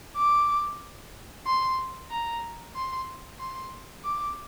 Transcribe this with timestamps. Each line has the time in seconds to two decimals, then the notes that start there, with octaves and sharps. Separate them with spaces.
0.16 D6
1.46 C6
2.10 A#5
2.76 C6
3.40 C6
4.04 D6